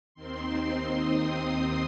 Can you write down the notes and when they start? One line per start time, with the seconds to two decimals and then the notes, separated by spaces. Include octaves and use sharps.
0.14 D#2 D#3 C4 C6
0.94 D#6
1.35 C6